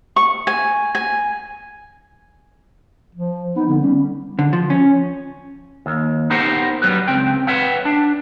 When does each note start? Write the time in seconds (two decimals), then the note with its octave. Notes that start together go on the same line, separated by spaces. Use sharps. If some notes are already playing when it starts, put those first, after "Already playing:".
0.16 C#6
0.47 G#5
0.95 G#5
3.15 F3
3.56 B3 D#4
3.68 D3 B3
3.82 G3 C#4
4.39 D3
4.53 F3
4.70 C#4
5.86 D#2
6.30 B3 D#4 G4 A#4 C5 F#5
6.82 F#3 G3 B4
7.08 C#2 C4 G5
7.47 B4 C#5 E5 F#5 G5
7.85 D4